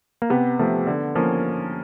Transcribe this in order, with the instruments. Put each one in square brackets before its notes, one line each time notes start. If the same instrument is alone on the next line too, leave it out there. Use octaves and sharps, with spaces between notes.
[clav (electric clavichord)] A#3
[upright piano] C3 [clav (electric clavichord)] B3
[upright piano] F3 A3
D3
F3 A#3 C#4